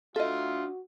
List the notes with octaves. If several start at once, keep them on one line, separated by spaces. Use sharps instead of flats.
D4 F4 F#4 A4 D#5 E5